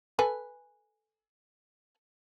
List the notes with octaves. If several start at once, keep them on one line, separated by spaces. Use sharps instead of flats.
A4 B4 G#5